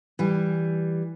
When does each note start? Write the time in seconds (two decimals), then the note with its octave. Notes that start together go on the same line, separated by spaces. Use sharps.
0.19 E3 G3